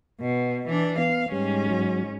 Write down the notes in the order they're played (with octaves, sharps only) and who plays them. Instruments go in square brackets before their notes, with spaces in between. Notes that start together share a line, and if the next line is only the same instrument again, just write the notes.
[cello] B2
E3 D4
[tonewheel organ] B3 [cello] F5
[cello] G#2 C#4 [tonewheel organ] G3
[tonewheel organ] F#3